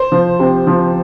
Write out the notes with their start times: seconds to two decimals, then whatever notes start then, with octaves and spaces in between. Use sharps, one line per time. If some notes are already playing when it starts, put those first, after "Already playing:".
Already playing: C5
0.12 F3
0.39 C3
0.67 F3